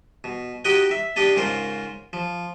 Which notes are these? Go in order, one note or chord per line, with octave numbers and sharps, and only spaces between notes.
B2
D#4 F#4 G4 D#5 F#5 G5
E5
D4 G4 D#5 A5
G#2 C#3 F4 A#4 C5
F3